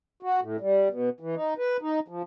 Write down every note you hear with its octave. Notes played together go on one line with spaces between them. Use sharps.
F#4
A2
G3
B2
E3
D#4
B4
D#4
F3